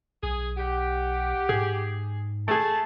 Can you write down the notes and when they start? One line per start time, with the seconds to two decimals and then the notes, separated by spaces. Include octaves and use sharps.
0.23 B1 G#4
0.57 G4 F#5
1.49 G#2 G#4
2.48 A3 G#4 A5